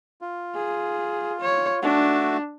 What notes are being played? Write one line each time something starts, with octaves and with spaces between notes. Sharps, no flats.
F4
G#4
C#5
A3 D4 F#4